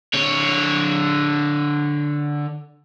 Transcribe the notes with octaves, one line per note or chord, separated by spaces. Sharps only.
D3 C#5